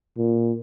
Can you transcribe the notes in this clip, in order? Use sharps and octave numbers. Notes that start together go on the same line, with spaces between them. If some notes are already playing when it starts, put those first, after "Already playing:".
A#2